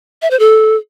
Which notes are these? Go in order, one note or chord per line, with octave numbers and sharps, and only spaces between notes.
E5
C5
A4